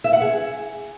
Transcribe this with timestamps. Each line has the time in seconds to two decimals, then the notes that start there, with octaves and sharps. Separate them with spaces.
0.04 E5
0.13 F#5
0.22 G#4